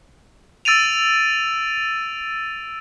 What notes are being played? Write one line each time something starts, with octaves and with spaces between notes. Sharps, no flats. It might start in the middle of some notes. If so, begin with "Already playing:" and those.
E6 A6 D7 D#7 F7